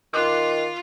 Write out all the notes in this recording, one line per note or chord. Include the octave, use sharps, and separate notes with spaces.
D#3 F4 C6 D6 F#6